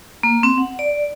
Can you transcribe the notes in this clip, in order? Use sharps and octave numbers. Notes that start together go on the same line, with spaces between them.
A#3
C4
F#5
D5